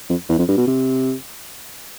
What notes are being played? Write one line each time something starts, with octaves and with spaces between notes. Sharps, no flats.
F2
E2
F2
G2
B2
C3